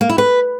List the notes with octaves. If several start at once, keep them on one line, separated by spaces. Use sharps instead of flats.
A#3
E4
B4